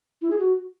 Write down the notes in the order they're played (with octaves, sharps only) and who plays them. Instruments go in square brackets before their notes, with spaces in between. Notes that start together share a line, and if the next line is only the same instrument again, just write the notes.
[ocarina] E4
G#4
F#4